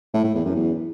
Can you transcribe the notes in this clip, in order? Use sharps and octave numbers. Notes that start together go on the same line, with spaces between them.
A2
A2
E2
F#2
E2